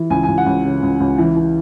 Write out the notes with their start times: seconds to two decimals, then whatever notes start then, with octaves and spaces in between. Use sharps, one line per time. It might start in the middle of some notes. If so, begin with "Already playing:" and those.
Already playing: E3
0.10 C#2 G#5
0.23 G#5
0.28 C#2
0.38 F#5
0.46 C#2
0.64 C#3
0.83 C#2
1.00 C#2
1.18 E3
1.36 E3